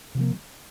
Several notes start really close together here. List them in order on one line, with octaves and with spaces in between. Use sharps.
C3 F3 A#3